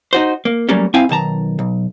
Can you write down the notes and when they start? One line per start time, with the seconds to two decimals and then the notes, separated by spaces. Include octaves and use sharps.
0.13 D#4 F#4 C5
0.45 A#3
0.69 F#3 G3 A3 A#3 C#4
0.94 C4 E4 F5 G5 G#5
1.09 B1 D#3 A5 A#5
1.59 B1